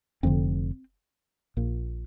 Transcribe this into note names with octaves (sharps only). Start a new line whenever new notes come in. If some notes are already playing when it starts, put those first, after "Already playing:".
F1 F2 D3 C4
A#1 A#2